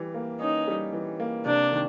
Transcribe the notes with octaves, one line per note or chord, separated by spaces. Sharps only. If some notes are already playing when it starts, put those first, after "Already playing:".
Already playing: E3 G3
A#3
C#4 D#4
G3
E3
A#3
C3 D4
D#3